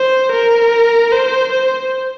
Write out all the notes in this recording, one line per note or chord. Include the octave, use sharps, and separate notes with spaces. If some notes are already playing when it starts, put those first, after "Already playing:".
Already playing: C5
A#4
C5
C5